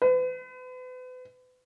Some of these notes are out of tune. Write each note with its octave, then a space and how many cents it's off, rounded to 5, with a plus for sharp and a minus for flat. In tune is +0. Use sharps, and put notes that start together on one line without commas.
B4 +40